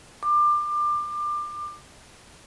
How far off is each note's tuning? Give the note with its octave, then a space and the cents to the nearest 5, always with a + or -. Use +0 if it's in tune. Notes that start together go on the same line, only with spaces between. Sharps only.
D6 +25